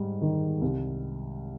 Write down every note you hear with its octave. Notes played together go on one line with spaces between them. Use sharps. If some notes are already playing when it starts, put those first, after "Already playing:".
Already playing: G#2 G3
D#3
C2